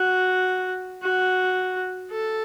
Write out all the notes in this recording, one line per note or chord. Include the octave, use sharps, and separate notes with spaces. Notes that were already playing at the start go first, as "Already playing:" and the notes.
Already playing: F#4
F#4
A4